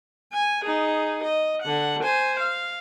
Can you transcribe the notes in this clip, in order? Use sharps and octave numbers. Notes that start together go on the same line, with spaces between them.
G#5
D#4 G#4
D#5
D3 F#5
C5 G#5
F5